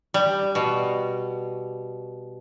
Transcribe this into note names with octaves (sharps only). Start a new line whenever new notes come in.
G3
B2